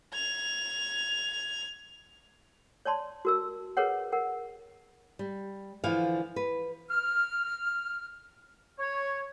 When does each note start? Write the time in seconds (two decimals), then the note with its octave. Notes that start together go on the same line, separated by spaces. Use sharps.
0.13 G#6 F7
2.85 C#5 D5 A5 C6
3.25 F#4 A#4 E6
3.77 G#4 A#4 B4 C#5 F#5
4.12 A#4 F#5
5.19 G3
5.84 D3 E3 F3 F5
6.36 B4
6.91 F6
8.79 C#5